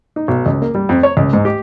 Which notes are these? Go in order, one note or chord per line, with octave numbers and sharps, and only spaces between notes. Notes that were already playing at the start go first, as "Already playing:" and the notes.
D#4
B1
C#2
A#3
G3
F2
C#5
C#2
G#2
G4